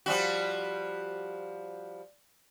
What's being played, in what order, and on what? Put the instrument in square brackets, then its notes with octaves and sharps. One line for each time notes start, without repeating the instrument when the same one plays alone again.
[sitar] F3 G3 F#4